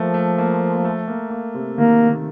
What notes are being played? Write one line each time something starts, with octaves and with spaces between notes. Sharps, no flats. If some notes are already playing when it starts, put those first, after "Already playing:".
Already playing: F3 A3 A#3
A3
A#3
A#3
A3
A#3
A#3
C3
D#3 A#3
D#3